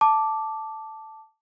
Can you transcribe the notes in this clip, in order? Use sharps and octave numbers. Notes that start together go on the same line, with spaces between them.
A5 D6